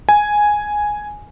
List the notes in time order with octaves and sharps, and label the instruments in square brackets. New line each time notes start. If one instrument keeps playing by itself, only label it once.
[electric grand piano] G#5